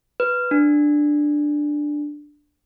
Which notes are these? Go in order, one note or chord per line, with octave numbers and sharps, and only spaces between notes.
B4
D4